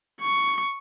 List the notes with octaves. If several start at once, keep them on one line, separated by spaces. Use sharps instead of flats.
C#6